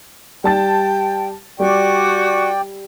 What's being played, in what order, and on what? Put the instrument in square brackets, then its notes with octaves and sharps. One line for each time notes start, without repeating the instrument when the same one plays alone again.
[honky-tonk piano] G3 A5 A6 [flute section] G5
[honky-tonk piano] G3 [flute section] F#4 C#6 D6 [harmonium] D5 G5